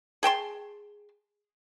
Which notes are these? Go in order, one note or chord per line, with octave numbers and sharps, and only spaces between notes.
G#4 G5 A5 C6